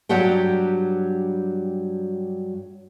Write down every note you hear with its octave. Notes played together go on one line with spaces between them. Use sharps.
G2 F#3 G3 G4 F#5 G5